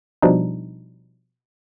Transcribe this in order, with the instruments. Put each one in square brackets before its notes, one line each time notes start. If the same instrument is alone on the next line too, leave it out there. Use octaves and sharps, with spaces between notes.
[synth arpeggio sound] B2 F3 G3 D4 D#4